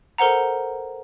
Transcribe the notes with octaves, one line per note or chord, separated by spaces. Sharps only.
A4 A#4 C5 F#5 A#5